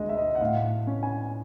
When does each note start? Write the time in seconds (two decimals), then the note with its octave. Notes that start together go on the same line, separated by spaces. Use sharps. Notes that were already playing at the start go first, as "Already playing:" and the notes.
Already playing: D2 G#3 D#5
0.09 E5
0.18 D#5
0.35 F#5
0.41 A2 F5
0.87 C#4
1.03 G#5